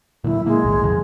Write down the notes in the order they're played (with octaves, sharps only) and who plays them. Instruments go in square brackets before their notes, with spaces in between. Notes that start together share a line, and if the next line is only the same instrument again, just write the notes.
[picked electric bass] A#2 D3 F#3 [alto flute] E4
[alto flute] G#3 [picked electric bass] A#3
[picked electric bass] B1 A2 D#3
F2 C#3 F3